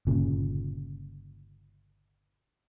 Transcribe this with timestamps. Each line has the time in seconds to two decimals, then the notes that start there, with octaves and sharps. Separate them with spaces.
0.07 G1 A#2 C#3